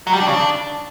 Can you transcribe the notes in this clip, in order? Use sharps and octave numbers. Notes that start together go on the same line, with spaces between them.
F#3
G3
D4
C#3
D4